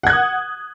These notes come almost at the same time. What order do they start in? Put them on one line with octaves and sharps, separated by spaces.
F#5 G#6 F#6 D#6